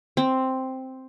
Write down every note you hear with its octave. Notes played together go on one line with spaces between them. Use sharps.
C4